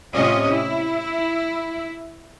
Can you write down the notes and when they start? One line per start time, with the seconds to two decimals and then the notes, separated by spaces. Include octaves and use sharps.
0.15 A2 C3 C#4 F4 D#5
0.49 E4